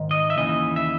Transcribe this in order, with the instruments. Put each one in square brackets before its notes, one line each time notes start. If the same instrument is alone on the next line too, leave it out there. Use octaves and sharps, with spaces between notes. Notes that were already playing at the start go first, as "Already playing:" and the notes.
Already playing: [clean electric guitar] G#2 D#3
D#5
E5
D#2 C#3 E3 D#5
E5